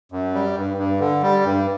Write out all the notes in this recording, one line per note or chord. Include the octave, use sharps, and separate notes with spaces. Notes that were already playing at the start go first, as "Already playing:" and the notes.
F#2
G3
G2
G2
D3
G3
G2